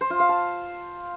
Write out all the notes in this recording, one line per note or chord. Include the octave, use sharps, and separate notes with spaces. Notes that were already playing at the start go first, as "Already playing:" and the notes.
C5
F4
F5
A5